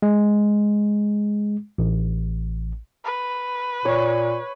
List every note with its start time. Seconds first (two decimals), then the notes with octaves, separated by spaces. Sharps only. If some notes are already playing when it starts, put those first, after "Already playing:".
0.02 G#3
1.78 A1
3.05 B4
3.85 A#2 C#5